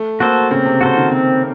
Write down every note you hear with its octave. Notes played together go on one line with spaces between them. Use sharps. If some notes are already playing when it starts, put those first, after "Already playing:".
Already playing: A3
A#3 F#4 A4 C5
C#3 C4
C3
C#3 F#4 A4 C5
D#3
C4